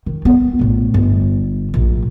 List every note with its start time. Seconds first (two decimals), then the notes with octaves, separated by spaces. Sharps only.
0.06 D#3
0.25 B3
0.59 A#1 A2
0.94 G1
1.74 A#1 A2